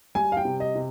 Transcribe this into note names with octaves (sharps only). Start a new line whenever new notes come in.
G3 G#5
F5
G5
C3
D#5
C3